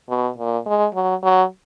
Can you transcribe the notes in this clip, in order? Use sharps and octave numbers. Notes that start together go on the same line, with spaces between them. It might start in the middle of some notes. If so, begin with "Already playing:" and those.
B2
A#2
G#3
F#3
F#3